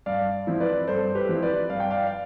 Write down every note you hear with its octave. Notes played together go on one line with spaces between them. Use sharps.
G2 D5 F5
F3 C4 E4
B4 D5
G2 A4 C5
G4 B4
F3 C4 E4
B4 D5
G2 F5
G5
D5 F5
F5